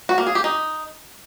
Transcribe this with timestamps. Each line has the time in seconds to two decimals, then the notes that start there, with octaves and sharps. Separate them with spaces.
0.09 F#4
0.18 A#3
0.27 G#4
0.35 G4
0.44 D#4